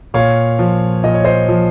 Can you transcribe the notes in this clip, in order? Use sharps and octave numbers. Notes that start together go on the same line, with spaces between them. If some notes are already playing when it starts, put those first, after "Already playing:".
A#2 C#5 F5
F3
A#2 D#5
C#5
C5 D#5
F3